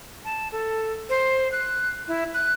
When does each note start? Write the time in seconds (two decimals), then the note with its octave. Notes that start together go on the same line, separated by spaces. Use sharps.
0.25 A5
0.52 A4
1.09 C5
1.52 F#6
2.08 E4
2.34 F#6